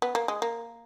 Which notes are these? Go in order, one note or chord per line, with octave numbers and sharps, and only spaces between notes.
B3
A#3
G#3
A#3